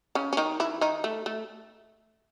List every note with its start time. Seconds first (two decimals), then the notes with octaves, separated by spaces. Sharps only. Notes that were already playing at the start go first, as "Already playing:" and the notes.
0.15 C#3 C#4
0.33 C#4
0.37 D#3 D#4
0.60 E3 E4
0.81 D#3 D#4
1.04 A3
1.26 A3